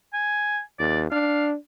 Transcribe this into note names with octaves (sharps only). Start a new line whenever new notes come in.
G#5
D#2 D5
D4 F5